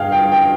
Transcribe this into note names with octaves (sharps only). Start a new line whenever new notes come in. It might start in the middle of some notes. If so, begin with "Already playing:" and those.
Already playing: G2 G#4 F5 G5
G5
G5